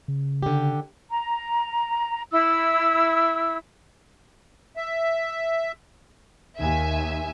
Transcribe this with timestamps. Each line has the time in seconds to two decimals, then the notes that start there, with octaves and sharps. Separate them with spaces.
0.08 C#3
0.43 D3 G4
1.11 A#5
2.31 E4 E6
4.77 E5
6.59 D#2 E5 G#5